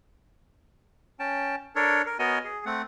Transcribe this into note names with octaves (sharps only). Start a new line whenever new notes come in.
C#4 G5 A5
D4 A4 A#4 C#5
A#4
B3 F#4 A#4 C#5 D#5 G#5
G#4
A3 C4 F#5